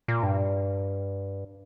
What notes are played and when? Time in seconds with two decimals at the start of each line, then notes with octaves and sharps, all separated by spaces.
0.08 A#2
0.23 G2